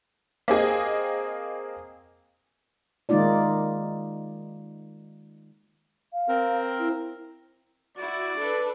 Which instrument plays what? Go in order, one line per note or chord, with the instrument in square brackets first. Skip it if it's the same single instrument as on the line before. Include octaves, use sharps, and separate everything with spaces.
[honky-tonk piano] A#3 C4 G#4 D#5
[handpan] D#3 G#3 A#3 D#4 F4 D5
[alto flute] F5
[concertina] C4 A#4
[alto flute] E4
[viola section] E4 F#4 [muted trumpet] D5
[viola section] D4 A4 B4